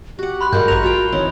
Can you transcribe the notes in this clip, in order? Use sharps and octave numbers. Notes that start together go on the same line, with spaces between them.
F#4 G4 F#5
B5 C6 F#6
G2 F#3 G#3 A#4 F#5 G6
A1 B4 C#5 A#5 F7
F4 F#4 C5 G5
E3 C4 D#4 C#5